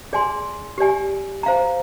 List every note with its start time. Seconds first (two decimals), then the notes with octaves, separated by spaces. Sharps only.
0.13 G#4 D5 G#5 C6
0.78 G4 D5 G#5
1.43 C5 F5 A#5